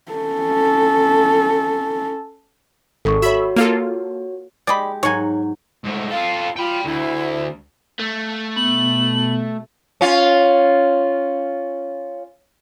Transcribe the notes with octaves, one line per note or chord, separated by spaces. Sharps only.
C#4 A4
G#1 A4 C#6
F#4 C#5 E5 B5
A#3 F4 A4
G#3 G4 D5 D#5 B5
G#2 F#3 C#5 G#5
G#2 A3
F4 A4 F5
F4 G5 B5
D2 E4
A3 F5 A5 F#6
B2 B3 F#7
C#4 F4